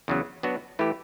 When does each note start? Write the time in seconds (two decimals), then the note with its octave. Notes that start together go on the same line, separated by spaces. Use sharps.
0.08 E2 C#3 F#3
0.43 F#3 B3 D4 F#4
0.79 E3 A3 E4 G4